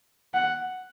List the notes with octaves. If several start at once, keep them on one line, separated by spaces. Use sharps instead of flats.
F#5